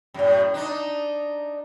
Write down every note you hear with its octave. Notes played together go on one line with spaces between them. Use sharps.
F#2 A2
D4 D#4